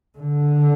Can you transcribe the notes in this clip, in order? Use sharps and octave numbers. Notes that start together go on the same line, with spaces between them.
D3